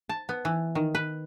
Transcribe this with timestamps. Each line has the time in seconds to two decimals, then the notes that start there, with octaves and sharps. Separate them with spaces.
0.09 A5
0.29 B3
0.45 E3
0.75 D#3
0.95 B4